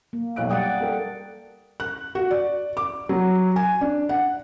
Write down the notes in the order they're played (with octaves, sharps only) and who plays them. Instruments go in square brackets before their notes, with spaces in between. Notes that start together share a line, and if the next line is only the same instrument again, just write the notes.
[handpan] A#3
[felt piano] B1 F#6 D7
[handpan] G3 D5 F#5 [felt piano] G5 D#6
[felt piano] A4 A#4 G5
F#6
F#4
D5
D6
F#3
G#5
D4
F#5